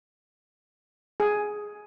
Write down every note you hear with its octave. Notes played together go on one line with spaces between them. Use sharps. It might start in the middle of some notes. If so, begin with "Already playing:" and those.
G#4